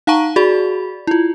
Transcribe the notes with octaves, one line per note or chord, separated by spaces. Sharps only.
D#4 F5 F#5 A5 A#5 C#6
F#4 G#4 D5 B5
E4 F4